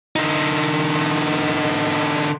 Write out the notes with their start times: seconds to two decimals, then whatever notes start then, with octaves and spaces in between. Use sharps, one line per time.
0.16 D3 D#4